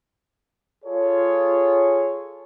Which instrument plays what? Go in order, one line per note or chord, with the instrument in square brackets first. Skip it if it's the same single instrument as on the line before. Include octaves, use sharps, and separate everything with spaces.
[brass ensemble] F4 G#4 A4 C#5